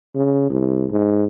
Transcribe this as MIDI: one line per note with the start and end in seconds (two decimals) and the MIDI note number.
0.15 0.47 49
0.50 0.86 36
0.91 1.25 44